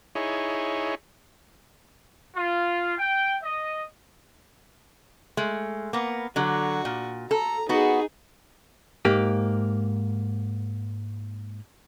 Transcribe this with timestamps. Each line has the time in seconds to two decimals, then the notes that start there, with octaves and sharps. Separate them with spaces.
0.15 D#4 E4 G#4 C#5
2.36 F4
2.98 G5
3.43 D#5
5.37 G#3 A3
5.93 A#3 B3
6.36 D3 F#3 F#4
6.85 A#2
7.31 A4 A#5
7.69 B3 D#4 F#4 G#4
9.05 G#2 A#3 G4